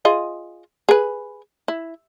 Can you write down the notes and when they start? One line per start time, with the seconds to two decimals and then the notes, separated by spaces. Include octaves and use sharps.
0.05 F4 G#4 D#5
0.89 G#4 B4
1.68 E4